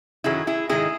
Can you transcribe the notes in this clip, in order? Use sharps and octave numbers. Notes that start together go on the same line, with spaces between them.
F#2 D#3 F#3 E4 G#4
E4 G#4
G#2 D#3 G#3 E4 G#4